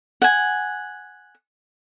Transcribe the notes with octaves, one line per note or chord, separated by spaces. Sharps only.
F#5 G#5